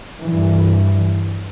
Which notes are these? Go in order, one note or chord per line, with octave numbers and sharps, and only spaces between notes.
G2 E3